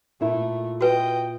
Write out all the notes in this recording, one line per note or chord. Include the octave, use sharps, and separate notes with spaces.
A#2 A3 E4
F#4 B4 D#5 G5